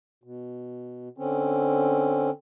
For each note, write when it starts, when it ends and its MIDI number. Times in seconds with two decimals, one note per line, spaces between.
0.24 1.09 47
1.18 2.30 50
1.18 2.30 60
1.18 2.30 61